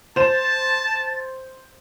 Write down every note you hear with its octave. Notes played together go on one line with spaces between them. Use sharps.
C5 A5 A6 E7